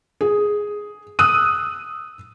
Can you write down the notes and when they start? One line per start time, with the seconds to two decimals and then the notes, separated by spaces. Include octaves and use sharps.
0.21 G#4
1.19 D#6 E6 F#6 D#7